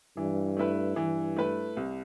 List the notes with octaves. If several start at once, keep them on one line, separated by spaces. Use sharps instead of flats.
G2 E3
A3 E4 B4
G2 E3
A3 E4 B4
C2